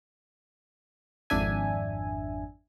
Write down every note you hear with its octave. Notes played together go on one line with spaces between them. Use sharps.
G#1 F2 D4 E5 G#5